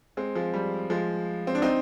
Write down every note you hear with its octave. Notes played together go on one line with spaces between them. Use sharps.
G#3 C4
F3 G#3
G3
F3 G#3
C4
D4
C4 D#4